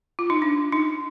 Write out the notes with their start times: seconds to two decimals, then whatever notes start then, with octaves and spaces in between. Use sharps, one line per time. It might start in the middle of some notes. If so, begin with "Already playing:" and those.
0.19 F4
0.30 D#4
0.42 D4
0.72 D#4